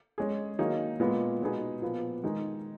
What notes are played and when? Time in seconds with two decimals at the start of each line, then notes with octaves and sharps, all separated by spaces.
0.18 G#3 C#4 G#4
0.59 D#3 F#3 A#3 D#4 G#4
1.00 A#2 G#3 B3
1.41 B2 G#3 B3 D#4 G#4
1.82 A#2 F3 B3
2.24 D#3 G#3 D#4 G#4